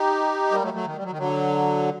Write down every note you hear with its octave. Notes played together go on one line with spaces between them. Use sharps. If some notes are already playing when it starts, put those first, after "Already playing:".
Already playing: D#4 G4
G3 A#3
F#3 A3
F#3 A3
D#3
G3
F#3
D#3
D3 F#3